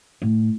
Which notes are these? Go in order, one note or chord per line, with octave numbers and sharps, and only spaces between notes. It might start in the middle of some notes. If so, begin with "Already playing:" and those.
A2